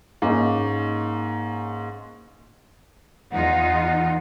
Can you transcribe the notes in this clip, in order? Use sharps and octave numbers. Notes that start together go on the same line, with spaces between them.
G#2 A#3 C#4 D#4
E2 D#4 F4 F#5